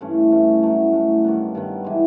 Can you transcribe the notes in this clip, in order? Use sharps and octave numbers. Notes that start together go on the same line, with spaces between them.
G2 E3 A3 C#4
G2 E3 A3 C#4
A2 F#3 A3
A2 F#3 A3
G2 D#3 G3 B3
G2 D#3 G3 B3
E3 G#3